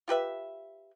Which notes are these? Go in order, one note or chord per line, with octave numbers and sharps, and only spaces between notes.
F4 G4 B4 E5